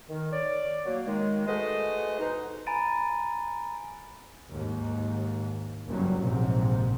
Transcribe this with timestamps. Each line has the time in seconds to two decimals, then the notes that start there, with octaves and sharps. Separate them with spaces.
0.09 D#3
0.32 C#5 D5
0.85 F#3 A#3
1.06 D#3 G#3
1.47 A3 F#4 G#4 B4 C5 D#5
2.20 B2 D#4
2.67 G#5 A#5 B5 A6 D7 D#7
4.50 D#2 G#2
5.87 F#1 G2 C#3 F#3
6.18 A#1 G#2 C3